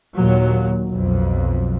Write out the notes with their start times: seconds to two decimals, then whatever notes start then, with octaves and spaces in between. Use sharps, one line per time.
0.16 D#2 A#2 F#3
0.90 B1 F2